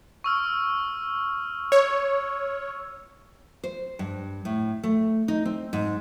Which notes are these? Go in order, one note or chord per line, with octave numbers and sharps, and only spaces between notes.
C#6 E6 F6
C#5
C5
G2
A2
A3
D#4
C4
G#2